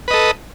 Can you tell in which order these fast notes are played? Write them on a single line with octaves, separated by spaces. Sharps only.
B4 D#5 A4